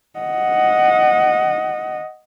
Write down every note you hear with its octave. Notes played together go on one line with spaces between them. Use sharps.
D#5 F#5